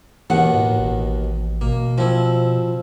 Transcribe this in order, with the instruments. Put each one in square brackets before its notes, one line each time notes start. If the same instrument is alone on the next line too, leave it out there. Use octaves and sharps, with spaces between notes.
[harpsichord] D#2 B2 D#3 [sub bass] E3 [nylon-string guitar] F#5
[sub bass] A2
A1
[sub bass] B2 [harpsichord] A#3
[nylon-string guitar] F3 [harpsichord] C4 E4